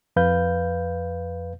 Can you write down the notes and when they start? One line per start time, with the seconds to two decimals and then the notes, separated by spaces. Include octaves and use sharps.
0.16 F2 B4 F5 G6